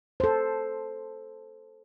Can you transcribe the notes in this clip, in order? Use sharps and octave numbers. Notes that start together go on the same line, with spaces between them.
A4 C5